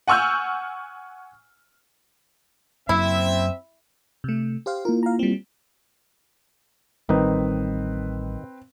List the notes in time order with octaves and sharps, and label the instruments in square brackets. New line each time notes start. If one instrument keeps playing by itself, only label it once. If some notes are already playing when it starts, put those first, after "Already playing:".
[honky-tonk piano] F#5 G#5 C#6 E6 F6 G6
[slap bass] F#2 F#3 A#3 [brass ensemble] C4 E5 [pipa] E4
[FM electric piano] C3 A3
G4 C5 F5
[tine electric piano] A#3 E4 F4 [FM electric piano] A#4
[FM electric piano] F5 A#5
G3 C4
[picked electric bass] A1 G3 [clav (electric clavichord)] D#3 D#4 [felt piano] C4 B4